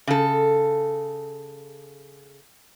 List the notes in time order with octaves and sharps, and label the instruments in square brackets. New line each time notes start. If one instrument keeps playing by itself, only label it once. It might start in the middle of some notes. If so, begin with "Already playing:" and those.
[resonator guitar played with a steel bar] C#3 A4